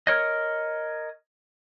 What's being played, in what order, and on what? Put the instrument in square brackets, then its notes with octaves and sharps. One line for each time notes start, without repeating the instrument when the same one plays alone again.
[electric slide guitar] A#4 C#5 D#5